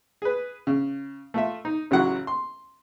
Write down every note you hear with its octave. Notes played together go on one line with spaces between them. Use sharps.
G#4 B4
C#3
A3 F4 E5
D#4
A1 C#3 F#3 E4 F#4 F#5
C6